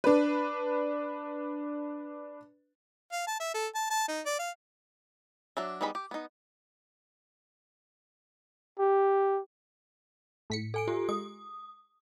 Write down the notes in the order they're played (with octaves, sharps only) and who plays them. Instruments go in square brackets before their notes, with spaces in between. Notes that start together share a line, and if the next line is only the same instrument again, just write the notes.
[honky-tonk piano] D4 B4
[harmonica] F5
A5
E5
A4
A5
A5
D#4
D5
F5
[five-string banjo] F#3 D4 E5
G3 B3 D#4 G#4 B5
G4
B3 D#4
[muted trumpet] G4
[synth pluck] A2 B6 C#7
[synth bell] A4 G#5 D7
F4 G4 A4
[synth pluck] G#3 [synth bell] D#6